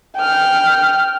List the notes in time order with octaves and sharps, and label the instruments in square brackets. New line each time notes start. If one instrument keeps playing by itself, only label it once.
[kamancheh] G5 F6